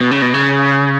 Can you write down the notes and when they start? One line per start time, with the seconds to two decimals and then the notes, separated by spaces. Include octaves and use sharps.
0.01 B2
0.11 C#3
0.22 B2
0.34 C#3